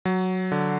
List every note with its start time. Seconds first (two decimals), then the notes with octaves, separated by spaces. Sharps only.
0.05 F#3
0.52 D3